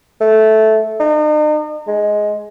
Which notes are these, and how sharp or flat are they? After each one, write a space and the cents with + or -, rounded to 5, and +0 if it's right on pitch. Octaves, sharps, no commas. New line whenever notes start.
A3 -10
D#4 -45
G#3 +10